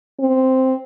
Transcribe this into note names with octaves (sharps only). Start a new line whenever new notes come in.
C4